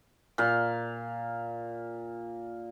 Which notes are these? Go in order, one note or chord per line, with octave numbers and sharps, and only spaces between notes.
A#2 F5